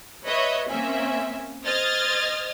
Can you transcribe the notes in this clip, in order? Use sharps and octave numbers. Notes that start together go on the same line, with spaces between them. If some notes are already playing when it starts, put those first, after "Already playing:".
B4 C#5 D#5 E5
A#3 C4 C#4 E5 G#5
C5 D#5 D#6 F6 G#6 A6